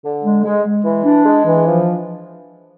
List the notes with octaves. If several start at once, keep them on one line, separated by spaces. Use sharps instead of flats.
D3
G#3
G#3
G#3
E3
D4
G#3
E3
F3